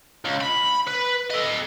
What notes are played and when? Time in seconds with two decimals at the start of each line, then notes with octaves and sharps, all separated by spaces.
0.25 C#2
0.41 B5
0.88 B4
1.31 A4 D#5